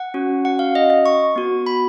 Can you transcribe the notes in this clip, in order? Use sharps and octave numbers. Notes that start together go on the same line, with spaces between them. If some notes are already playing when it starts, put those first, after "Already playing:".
Already playing: F#5
C#4 F#4
F#5
F5
D#5
D#5
C#6
B3 F#4
B5